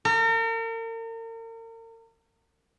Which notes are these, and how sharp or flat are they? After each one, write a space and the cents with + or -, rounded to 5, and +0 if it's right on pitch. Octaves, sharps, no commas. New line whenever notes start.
A#4 -40